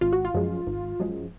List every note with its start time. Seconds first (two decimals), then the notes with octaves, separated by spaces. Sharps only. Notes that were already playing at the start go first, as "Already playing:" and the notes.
0.01 G#1 F4
0.13 F#4
0.25 F4
0.34 F#2 F3 G#3
0.67 G#1
1.00 F#2 F3 G#3